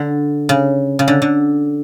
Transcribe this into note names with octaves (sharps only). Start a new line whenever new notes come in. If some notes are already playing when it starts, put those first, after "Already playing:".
Already playing: D3
C#3
C#3
D3
D3